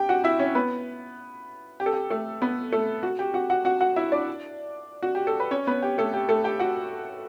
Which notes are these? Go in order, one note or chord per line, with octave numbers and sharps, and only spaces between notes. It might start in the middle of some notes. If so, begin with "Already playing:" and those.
Already playing: G4 G5
F#4 F#5
E4 E5
C#4 C#5
B3 B4
G4
A4
G4
A3 A4
B3 B4
A3 A4
F#4
G4
F#4 F#5
F#4 F#5
F#4 F#5
F#4 F#5
E4 E5
D4 D5
F#4
G4
A4
B4
C#4 C#5
B3 B4
G4
A3 A4
G4
A3 A4
G4 G5
F#4 F#5